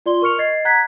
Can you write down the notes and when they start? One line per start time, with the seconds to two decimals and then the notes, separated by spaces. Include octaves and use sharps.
0.06 F4 D5 C6 G7
0.22 A#4 C#6 F6 C#7 F7
0.38 D#5 G#6 A6 C7
0.65 F#5 A#5 F#6 G#6 B6